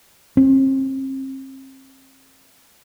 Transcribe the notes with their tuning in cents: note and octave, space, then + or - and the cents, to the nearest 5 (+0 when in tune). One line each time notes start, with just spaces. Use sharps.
C4 +40